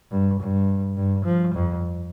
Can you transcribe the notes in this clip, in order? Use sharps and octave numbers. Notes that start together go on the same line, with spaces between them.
G2
G2
G2
F3
F2